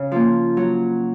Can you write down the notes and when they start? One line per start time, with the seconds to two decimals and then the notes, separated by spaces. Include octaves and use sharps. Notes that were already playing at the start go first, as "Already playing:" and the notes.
Already playing: C#3
0.12 F3 A#3
0.57 F#3